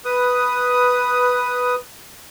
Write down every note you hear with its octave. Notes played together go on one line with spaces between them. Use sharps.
B4 D#6